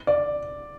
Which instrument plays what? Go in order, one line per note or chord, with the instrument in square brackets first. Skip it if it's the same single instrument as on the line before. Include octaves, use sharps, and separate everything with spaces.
[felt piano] D5